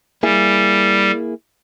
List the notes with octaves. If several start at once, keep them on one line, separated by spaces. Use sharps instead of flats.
G3 A#3 E4 G#4